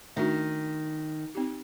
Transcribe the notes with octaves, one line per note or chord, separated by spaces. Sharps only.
D#3 A3 D4 F#4
C4 D#4 G4